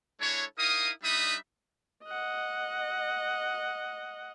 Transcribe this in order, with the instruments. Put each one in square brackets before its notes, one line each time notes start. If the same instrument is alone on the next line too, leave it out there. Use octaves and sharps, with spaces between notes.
[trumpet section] G#3 D4 E4 A4 C#5
D#4 E4 A#4 F5 D#6
G3 D4 D#4 E5 B5 D#6
[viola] D#5 F#5